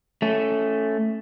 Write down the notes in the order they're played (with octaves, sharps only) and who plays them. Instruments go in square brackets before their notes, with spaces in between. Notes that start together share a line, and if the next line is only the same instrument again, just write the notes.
[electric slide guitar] A3 C#4